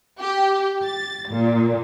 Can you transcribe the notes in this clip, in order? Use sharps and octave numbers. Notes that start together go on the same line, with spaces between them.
G4
A6
A#2